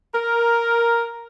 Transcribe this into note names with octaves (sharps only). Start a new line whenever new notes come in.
A#4